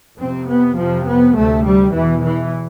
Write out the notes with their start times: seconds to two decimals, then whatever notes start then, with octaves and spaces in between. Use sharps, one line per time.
0.18 F2 C3 C4
0.48 B3
0.77 F2 C3 F3
1.06 B3
1.35 D2 C3 A3
1.64 G3
1.93 E2 B2 E3
2.23 E3